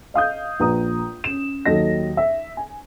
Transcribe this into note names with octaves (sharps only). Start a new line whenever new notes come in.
D#5 F5 D#6 G6
A#1 B4 A#5 D#6
C#4 E7
D#2 F#3 A4 D#5 A#6
E5
G#5